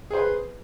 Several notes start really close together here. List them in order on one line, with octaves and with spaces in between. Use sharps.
G#4 C5 B4